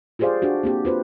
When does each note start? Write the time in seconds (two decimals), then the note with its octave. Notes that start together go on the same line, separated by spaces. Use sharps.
0.19 F4 G4 G#4 C5 D5 F5
0.42 D4 F#4 G4
0.63 A#3 C4 G4
0.85 F4 B4 C5